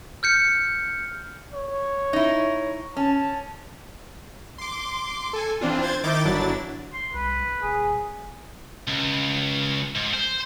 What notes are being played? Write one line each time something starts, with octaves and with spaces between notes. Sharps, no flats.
F6 G6 C#7
C#5
D#4 E4
C#4 A5
C6 D6
A4 G#5
E3 C4 D4 F4
C5 G#6 A6
D#3 D#4 E4 D6 G6 A6
G1 F#3 D4 E4 A6
C6
C2 B4
D#1 G#4
C#2
G#2
C5